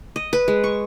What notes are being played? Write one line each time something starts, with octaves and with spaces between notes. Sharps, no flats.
D#5
B4
G#3
C#6